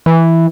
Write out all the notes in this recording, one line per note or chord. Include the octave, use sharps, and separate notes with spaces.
E3